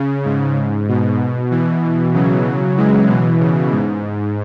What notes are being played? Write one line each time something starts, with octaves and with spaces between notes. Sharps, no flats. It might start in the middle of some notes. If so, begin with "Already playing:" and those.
Already playing: C#3
G#2
B2
B2 E3
C#3 F#3
E3 G#3
B2 E3
C#3
G#2